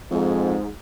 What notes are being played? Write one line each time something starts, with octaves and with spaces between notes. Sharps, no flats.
F2 G#2